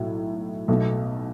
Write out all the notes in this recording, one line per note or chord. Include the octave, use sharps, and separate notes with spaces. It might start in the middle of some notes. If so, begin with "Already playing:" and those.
Already playing: B1 A2 F#3
B1 B2 A3